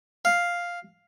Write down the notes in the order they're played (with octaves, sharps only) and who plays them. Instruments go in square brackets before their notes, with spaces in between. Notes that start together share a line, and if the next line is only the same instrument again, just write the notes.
[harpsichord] F5